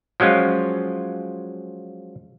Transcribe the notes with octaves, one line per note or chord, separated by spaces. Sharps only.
F3 F#3 G#3 C#4 F4